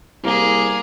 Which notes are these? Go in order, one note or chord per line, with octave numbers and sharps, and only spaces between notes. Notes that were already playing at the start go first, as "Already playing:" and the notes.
C2 A#3 G#4